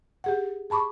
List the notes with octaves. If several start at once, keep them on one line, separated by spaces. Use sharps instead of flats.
G4 G#4 F#5
G#4 A5 B5 C#6 D6